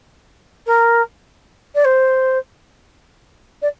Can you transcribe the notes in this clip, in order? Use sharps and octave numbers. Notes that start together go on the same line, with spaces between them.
A#4
D5
C5
D5